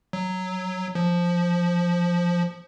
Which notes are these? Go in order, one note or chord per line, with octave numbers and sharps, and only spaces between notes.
F#3
F3